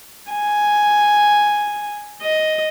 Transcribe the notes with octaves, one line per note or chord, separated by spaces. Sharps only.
G#5
D#5